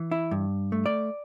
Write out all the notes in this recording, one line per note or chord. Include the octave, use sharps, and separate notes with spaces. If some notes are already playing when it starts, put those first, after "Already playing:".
Already playing: E3
E4
G2
A3
D5